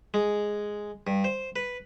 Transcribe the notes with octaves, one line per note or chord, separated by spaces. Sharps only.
G#3
G2
C5
B4